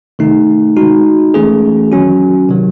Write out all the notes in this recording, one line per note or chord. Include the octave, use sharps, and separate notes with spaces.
C3 D#3 A3 D#4
G#3 D#4 F#4
E3 A3 C#4 G#4
D#3 F#3 C#4 F#4
C3 D#3 F#3